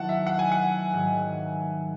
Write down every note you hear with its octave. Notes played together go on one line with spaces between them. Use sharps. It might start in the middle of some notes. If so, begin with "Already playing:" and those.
Already playing: D#3 F#3 C#4 E4 F#5 A5
E5
F#5
G#5
F#5
G#2 D#3 F#3